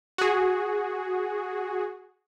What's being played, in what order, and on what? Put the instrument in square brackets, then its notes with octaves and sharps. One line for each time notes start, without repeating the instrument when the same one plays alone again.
[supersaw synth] F#4 G#4